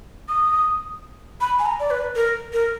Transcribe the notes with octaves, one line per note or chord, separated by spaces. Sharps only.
D#6
B5
G#5
A#5
D5
B4
A#4
A#4